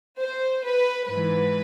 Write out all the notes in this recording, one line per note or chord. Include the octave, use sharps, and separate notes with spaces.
C5
B4
G#2 E3 B4